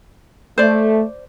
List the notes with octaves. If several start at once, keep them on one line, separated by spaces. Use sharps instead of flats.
A3 C5 D5